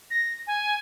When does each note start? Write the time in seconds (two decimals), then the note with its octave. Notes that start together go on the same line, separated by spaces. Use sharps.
0.10 A#6
0.47 G#5